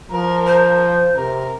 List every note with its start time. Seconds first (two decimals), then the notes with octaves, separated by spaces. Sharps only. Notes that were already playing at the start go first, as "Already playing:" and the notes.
0.11 F3 A#4
0.47 C5
1.16 C3 A#4